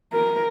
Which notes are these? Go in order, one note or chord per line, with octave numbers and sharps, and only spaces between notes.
A#4